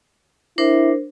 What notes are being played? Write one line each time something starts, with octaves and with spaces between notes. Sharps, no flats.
D4 E4 A#4 C5